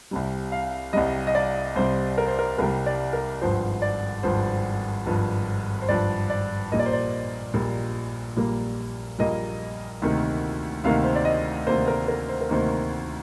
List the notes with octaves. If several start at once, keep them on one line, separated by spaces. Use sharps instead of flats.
C2 C3 G3
F5
C2 C3 G3 D#5
D#5
D5
C2 C3 G3 C5
A#4
C5
A#4
C2 C3 G3 A#4
D5
A#4
G#1 G2 F3 C5
D5
G#1 G2 F3 C5
G#1 G2 F3
C5
G#1 G2 F3 D5
D5
A#1 A#2 G3 A#3 D#5
D5
C5
D5
A#1 A#2 G3 A#3
A#1 A#2 G3 A#3
A#1 A#2 G3 A#3 D#5
D2 C3 D#3 A#3
D2 C3 D#3 A#3 F5
C5
D5
D#5
D2 C3 D#3 A#3 C5
A#4
A#4
C5
A#4
D2 C3 D#3 A#3 C5